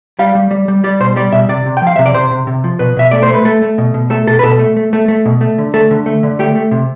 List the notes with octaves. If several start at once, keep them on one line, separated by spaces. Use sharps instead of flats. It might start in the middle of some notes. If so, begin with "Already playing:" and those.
G3 F5
G3
G3
G3
G3 D5
B2 C5
G3 D5
B2 E5
C3 D5
C3
G5
F3 F5
C3 E5
D5
C3 C5
C3
C3
F3
B2 B4
B2 E5
A3 D5
C5
A3
B4
A3 A4
A3
B2
B2
A3 A4
B2 A4
B4
B2 A4
A3
A3
A3
A3
B2
A3
D3
A3 A4
D3
A3
D3
A3 G4
A3
C3